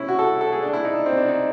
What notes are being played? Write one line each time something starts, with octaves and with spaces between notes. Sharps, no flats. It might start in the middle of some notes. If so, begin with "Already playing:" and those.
Already playing: C#4 E4
F#4
A4
A4
G#4
D4
E4
D#4
D4
C4
D4
D#4